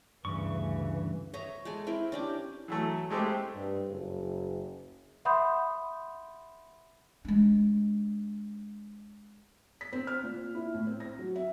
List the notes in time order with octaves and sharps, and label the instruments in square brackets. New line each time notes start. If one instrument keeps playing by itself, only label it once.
[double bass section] D2 E3 [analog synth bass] G2 [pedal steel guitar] C#3 C#6
[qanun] C#5 D#5 E5 A#5
G#3 A4 G#5
C4 E4 A#4
C#4 D4 G4
[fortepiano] E3 F#3 A3
G#3 A3 C4 G4
[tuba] G2
F#1
[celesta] E5 F#5 B5 C6 D#6 G6
[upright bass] G#3 D4
[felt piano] B6
C4
F6
A#2
E4
A2
C4
A#6
F#3
E5